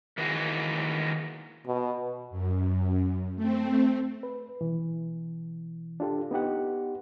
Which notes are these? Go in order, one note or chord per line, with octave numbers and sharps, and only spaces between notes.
D#3 E3 A#3 E4 F#4 G#4
B2
F#2
A3 C4
B4
B2 E3
D4 F4 G4 A4
B3 D#4 G4 F#5